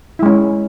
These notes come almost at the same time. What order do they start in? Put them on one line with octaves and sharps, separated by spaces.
E4 G#3 C#4